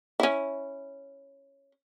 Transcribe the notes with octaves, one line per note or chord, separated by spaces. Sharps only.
C#4 E4